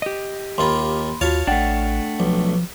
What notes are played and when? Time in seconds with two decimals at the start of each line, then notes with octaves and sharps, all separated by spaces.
0.02 G4 D#5
0.58 D#2 A#3 F4 B5 C6
1.21 D#2 F4 F#4 C#5 F5 A5
1.47 A1 A3 D4 F#5 G5 A6
2.20 B1 F3